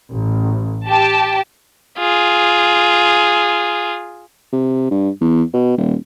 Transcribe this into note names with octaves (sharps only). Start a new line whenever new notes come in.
A1
G4 A5
F4 G#4
C3
G2
E2
B2
D#1